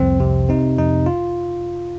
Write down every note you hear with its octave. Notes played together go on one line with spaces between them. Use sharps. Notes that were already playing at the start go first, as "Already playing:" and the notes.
Already playing: C2 F2 C4
C3
C3 D#4
F2 D#4
F4